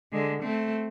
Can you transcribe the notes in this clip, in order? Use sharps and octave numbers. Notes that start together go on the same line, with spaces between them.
D3 G#3
A3 C4